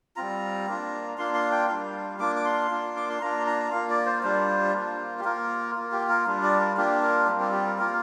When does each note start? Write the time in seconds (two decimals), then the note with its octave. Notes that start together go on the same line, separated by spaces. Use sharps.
0.16 G3 C4 F4 A#5
0.67 A#3 D4 F4
1.18 A#3 D4 F4 C6
1.34 C6
1.52 G5
1.68 G3 D4 F4 F5
2.19 A#3 D4 F4 D6
2.36 D6
2.45 C6
2.71 A#3 D4 F4
2.96 D6
3.10 C6
3.21 A#3 D4 F4 A#5
3.47 A#5
3.72 A#3 F4 F5
3.89 D5
4.06 C5
4.23 G3 D4 F4 C5
4.74 A#3 F4
5.19 G4
5.25 A#3 F4 A#4
5.75 A#3 F4
5.92 G4
6.09 A#4
6.27 G3 D4 F4
6.43 D5
6.60 A#4
6.77 A#3 D4 F4 G4
7.03 A#4
7.28 G3 C4 F4 G4
7.41 G4
7.53 G4
7.67 A#4
7.78 A#3 F4 A#4